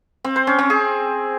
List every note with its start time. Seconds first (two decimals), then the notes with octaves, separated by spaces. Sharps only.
0.24 C4
0.36 C5
0.47 C#4
0.59 C4
0.70 G#4